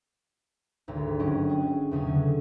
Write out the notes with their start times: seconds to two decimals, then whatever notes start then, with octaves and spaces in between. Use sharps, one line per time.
0.88 G#1 D2
1.19 G1 F#3 C#4 D#5 G5
1.49 G#4
1.91 E2 C#3 C#4 G#5
2.07 D3